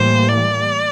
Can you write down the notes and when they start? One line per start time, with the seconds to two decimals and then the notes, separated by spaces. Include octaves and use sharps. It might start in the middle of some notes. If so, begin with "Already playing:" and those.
Already playing: A2 E3 G3 A#3 C5
0.28 D5